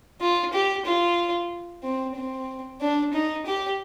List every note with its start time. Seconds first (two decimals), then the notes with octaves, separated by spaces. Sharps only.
0.21 F4
0.54 G4
0.86 F4
1.83 C4
2.15 C4
2.81 D4
3.13 D#4
3.46 G4